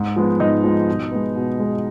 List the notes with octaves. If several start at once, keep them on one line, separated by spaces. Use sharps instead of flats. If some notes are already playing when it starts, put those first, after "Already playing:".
Already playing: G#2
F3 G#3 B3
G#2 D#4 D#5
F3 G#3 B3
B2
G#3 B3
B2
G#3 B3